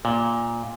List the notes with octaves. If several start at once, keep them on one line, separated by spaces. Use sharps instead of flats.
A#2